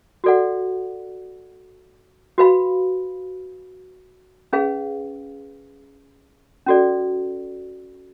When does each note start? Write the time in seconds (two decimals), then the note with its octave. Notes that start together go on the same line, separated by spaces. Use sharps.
0.24 F#4 A4 D5 F#5
2.38 F#4 B4 F5 B5
4.53 C#4 G#4 B4 F5
6.66 C#4 F#4 A4 D5